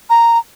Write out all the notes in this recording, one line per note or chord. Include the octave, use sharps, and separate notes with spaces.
A#5